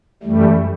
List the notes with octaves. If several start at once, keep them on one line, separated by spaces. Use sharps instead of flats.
F#2 E3 G3 A3